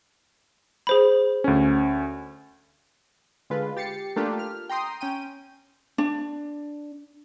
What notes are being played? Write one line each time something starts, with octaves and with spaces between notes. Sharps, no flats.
G#4 C5 B5
D2 C#4
D3 G#3 F4 B4
G4 A6 C7 C#7
A3 A#3 D4 F4 G4
F6
G5 A#5 C6 D#6
C#4 G5 D#7
D4